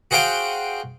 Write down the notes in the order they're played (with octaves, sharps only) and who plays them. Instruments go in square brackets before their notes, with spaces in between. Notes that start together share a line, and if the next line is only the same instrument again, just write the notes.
[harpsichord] F#4 G#4 C5 F5 G5 G#5